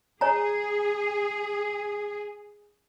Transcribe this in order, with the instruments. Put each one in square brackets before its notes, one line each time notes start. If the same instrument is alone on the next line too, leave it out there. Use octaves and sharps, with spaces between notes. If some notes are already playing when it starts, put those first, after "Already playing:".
[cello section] G#4 [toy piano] C#5 G#5 A#5